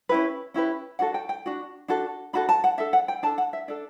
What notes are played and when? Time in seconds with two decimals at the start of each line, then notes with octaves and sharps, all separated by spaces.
0.09 C#4 E4 G4 B4
0.54 C#4 E4 G4 B4
0.99 D4 F#4 A4 F#5
1.14 G5
1.29 G5
1.46 D4 F#4
1.88 D4 F#4 A4
2.33 D4 F#4 A4 B5
2.49 A5
2.64 F#5
2.78 D4 A4 E5
2.93 F#5
3.08 G5
3.23 D4 A4 A5
3.38 F#5
3.53 E5
3.68 D4 A4 D5